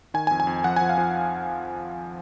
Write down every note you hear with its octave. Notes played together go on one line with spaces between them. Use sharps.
D#3 G#5
G#5
F2
G#5
F2
F3 F#5
F3 G#5
F5
F3